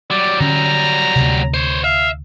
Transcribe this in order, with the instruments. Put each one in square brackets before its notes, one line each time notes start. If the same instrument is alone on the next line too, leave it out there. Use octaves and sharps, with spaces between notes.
[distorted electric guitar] F#3 G3 [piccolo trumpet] D5
[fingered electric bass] D3 C#4 [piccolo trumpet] A#5
[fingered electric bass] D2 C3
[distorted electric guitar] C5 C#5
[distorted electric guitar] E5 [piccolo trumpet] F5